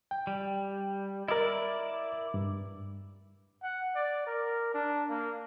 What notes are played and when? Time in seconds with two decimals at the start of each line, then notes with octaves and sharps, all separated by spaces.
0.11 G5
0.27 G3
1.28 E4 A#4 D5 D#5
2.34 G2
3.63 F#5
3.95 D5
4.27 A#4
4.74 D4
5.09 A#3